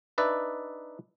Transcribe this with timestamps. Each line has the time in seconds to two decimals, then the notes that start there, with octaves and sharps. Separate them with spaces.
0.18 D4 D#4 B4 D5 E5